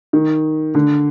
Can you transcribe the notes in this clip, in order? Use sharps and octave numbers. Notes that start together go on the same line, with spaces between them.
D#3
D3